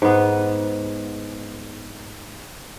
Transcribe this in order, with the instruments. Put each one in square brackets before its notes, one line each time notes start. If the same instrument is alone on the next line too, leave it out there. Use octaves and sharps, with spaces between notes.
[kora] G#2 B3